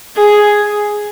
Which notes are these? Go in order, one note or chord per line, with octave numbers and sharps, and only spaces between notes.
G#4